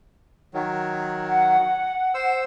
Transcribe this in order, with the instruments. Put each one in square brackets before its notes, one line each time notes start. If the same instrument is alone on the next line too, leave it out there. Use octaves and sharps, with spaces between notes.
[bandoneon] D#3 F#3
[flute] F#5
[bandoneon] C5 E6